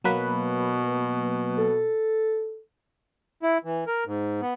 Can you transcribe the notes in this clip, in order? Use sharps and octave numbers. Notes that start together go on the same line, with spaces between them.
B2 F#3 A#3 B4
A4
E4
E3
A#4
G#2
B3